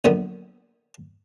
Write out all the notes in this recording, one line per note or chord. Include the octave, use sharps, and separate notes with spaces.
A#1 F#2 D3 B3